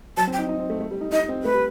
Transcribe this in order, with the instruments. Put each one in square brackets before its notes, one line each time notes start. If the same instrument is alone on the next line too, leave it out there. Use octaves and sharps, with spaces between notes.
[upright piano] F#3 [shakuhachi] A5
[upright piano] C4
[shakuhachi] G5
[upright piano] D#4
D#4
C4
A3
A3
G3
D#4
[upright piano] D#4 [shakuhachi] D#5
[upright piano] C4
[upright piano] A3 [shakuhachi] B4
[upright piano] G3